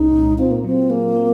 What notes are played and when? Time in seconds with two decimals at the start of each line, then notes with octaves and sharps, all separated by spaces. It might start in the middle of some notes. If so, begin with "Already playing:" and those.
Already playing: C2 G#3 C#4 D#4
0.13 A#2
0.39 C4 F4
0.51 A#3
0.64 F#3 C4
0.90 A#3 G#4
1.16 C4